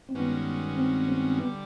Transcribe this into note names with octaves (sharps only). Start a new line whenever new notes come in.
C4
G2 D#3 G#3 B3 C#4 F#4
C4
C4
D3 G3 B3